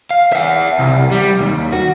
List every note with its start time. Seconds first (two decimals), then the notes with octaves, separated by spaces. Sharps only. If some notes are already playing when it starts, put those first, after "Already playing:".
0.11 F5
0.33 E5 F#5
0.79 C2
1.11 G3
1.40 D#2
1.72 F#4